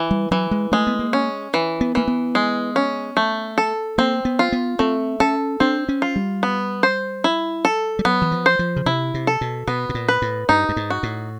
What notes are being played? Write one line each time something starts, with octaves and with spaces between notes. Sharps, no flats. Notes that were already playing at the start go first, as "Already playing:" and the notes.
Already playing: E3
G3
E3 F#3
G#3
G#3 A3
B3
A#3
C#4
E3
B3
E3 A#3
B3
G#3
C#4
A3
A4
A#3 C4
B3
F4
B3
A3 C4
C#4 A4
C4 D4
C#4
F4
G3
B3
C5
E4
A4
G3
F#3 B3
E3
F3
C5
F3
C#3
C3 E4
C3
A4
B2
B2 B3
B2
A#2
B4
A2
G2 D#4
G2
G#2
F#4
A2